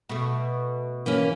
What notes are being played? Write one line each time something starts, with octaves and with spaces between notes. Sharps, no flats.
B2 A3
E3 A#3 C#4